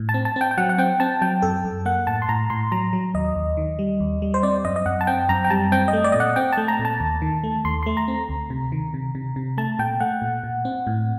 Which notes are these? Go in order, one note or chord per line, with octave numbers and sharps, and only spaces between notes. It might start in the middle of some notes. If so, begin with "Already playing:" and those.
Already playing: A2
A5
C4
A5
C4 G5
G5
F#3 F#5
F#5
C4 G5
C4 A5
F#3 G5
F#2 A4
F#2
A#3 F#5
A2 A5
C6
A2 A#5
A2 C6
F#3 A#5
F#3
D#2 D#5
D#2
D#3
G3
D#2
G3
C5
C4 D5
F#2 D#5
D#5
F#2 F#5
A5
C4 G5
F#2 A#5
G5
G3 A5
C4 G5
D#5
A3
D5
A#2 D#5
F#5
C4 G5
A3 A5
A#5
A#2
A5
D#2
D#3
A3
D#2 C6
A3 C6
A#5
C4
D2
C3
D#3
C3
C3
C3
A3 A5
A#2 G5
A3 F#5
A#2
A#2
C4
A2